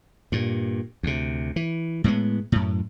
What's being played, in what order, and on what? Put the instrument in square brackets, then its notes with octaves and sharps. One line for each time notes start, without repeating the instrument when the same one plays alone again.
[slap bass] G2 A#2
D2 C3
E3
A2 G#3 A3 B3
F#2 A2